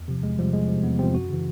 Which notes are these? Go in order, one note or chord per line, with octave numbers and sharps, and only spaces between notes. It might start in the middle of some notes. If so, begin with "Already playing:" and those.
Already playing: E2
C3 F3
E2 G#3
C3 F3 G3
E2 G#3
C3 F3
E2 B3
C3 F3 C4
F#2 F#4
C#3 E3